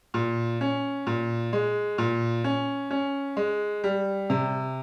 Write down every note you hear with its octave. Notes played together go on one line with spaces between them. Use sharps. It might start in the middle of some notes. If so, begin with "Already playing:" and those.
A#2
C#4
A#2
G#3
A#2
C#4
C#4
G#3
G3
C3